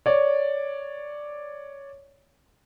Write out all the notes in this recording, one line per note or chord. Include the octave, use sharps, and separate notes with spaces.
C#5 D5